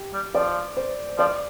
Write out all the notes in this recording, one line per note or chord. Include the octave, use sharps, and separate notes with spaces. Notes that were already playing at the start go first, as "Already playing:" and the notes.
Already playing: G4
G3
F3 D5
C5
F3 D5